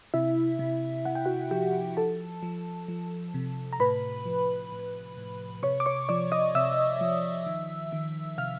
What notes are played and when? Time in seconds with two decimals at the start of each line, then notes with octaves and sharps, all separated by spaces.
0.14 C3 E4 E5
0.59 C3
1.05 C3 F#5
1.15 G5
1.26 F#4 F#5
1.51 F3 G4 G5
1.97 F3 A4 A5
2.43 F3
2.88 F3
3.34 C3
3.73 A#5
3.80 A2 B4 B5
4.26 F3
4.72 A2
5.17 A2
5.63 C3 C#5 C#6
5.80 D6
5.86 C#5 C#6
6.09 F3 D5 D6
6.32 D#5 D#6
6.55 C3 E5 E6
7.01 F3
7.46 D#3
7.92 D#3
8.38 C3 F5 F6